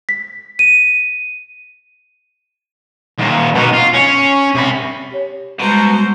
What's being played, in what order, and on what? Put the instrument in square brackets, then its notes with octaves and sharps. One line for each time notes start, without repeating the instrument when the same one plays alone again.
[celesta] B6
D#7
[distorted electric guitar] D#2 A#2
B2 D#4
F4
C#4
C3 B5
[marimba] G4 C#5
[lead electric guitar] B2 [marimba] G3 G#3 [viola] C5 A#5